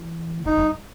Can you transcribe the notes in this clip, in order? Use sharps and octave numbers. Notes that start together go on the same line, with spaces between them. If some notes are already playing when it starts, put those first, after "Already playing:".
Already playing: E3
D#3 D#4
G2